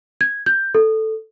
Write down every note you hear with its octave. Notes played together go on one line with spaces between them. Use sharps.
G#6
G6
A4